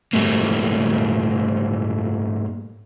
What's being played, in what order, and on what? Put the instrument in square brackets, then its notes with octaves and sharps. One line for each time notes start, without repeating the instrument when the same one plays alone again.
[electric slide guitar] G#2 G3 A3 A#3